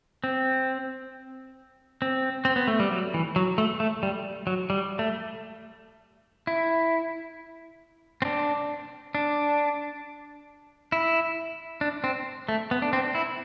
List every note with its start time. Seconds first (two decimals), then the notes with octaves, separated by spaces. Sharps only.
0.24 C4
2.02 C4
2.45 C4
2.56 B3
2.68 A3
2.80 G3
2.92 F#3
3.14 E3
3.36 F#3
3.58 A3
3.80 A3
4.03 G3
4.47 F#3
4.70 G3
4.99 A3
6.47 E4
8.22 C4
8.25 D4
9.15 D4
10.92 E4
11.81 D4
12.04 C4
12.49 A3
12.71 B3
12.82 D4
12.93 C4
13.15 E4